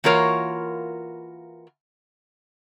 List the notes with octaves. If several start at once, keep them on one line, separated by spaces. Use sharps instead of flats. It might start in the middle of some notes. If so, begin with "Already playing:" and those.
E3 A#3 F4 F#4 A#4 C#5